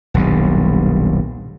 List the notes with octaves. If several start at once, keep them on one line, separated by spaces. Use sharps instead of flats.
D#1 B1 G2